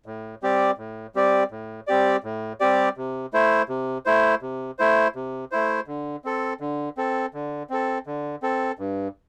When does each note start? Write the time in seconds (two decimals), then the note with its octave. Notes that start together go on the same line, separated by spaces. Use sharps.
0.06 A2
0.42 G3 C4 G4 D5
0.78 A2
1.15 G3 C4 G4 D5
1.51 A2
1.87 G3 C4 G4 D5
2.24 A2
2.60 G3 C4 G4 D5
2.97 C3
3.33 A3 E4 C5
3.69 C3
4.06 A3 E4 C5
4.42 C3
4.79 A3 E4 C5
5.16 C3
5.52 A3 E4 C5
5.87 D3
6.24 C4 A4
6.60 D3
6.97 C4 A4
7.34 D3
7.70 C4 A4
8.07 D3
8.43 C4 A4
8.79 G2